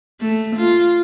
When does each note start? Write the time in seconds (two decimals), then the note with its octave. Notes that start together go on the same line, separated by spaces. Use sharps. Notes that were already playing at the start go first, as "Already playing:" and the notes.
0.21 A3
0.57 F4